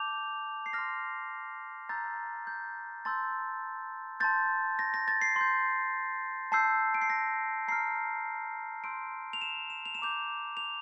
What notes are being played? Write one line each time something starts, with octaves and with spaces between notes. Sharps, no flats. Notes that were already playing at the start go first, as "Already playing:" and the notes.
Already playing: A5 D6 G6 F7
C7
C6 F6 A#6
A#5 E6 G6 A6
G6
A5 C6 E6 G6 A6
A5 C6 G6 A6
A#6
A#6
A6
C7
C6 G6
A5 E6 G6 C7
D7
C7
A#6
A#5 F6 C7
C6 E6 G6 D7
F7
E7
E7
F7
E7
A#5 D6 G6 F7
F7